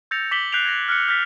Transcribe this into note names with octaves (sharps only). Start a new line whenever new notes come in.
E6 G6 A6 A#6 C#7 F7
D6 B6 F#7 G7
F#6 G6 B6 C7 D7 F7
G#6 A#6
F6 F#6 C#7
F6 G6 A6 B6